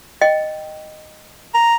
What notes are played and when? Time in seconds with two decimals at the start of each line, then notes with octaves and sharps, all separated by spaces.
0.21 D#5 G5
1.54 A#5